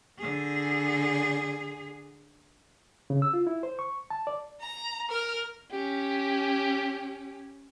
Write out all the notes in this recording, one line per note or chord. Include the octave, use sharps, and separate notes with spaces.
D3 G#4
C#3
E6
F4
E4
C5
C#6
A5
D5
A#5
A#4 F6
C#4 G4